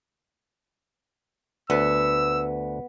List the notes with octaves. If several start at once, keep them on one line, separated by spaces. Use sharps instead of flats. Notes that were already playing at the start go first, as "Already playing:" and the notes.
D2 B3 B4 E6